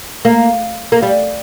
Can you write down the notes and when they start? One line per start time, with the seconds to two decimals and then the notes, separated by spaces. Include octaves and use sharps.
0.25 A#3
0.92 A#3
1.02 G3